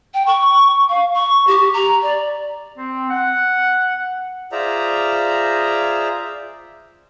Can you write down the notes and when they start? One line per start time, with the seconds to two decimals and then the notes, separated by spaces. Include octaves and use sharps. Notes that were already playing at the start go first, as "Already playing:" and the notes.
0.14 G5
0.26 C#6
0.89 F5
1.14 C#6
1.47 G4
1.74 A#5
2.02 D5
2.77 C4
3.09 F#5
4.52 F4 G#4 C5 D5 E5 A#5